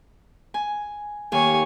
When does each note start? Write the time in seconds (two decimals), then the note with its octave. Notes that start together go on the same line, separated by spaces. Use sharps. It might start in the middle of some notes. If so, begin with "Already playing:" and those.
0.54 G#5
1.32 D#2 C#5 G#5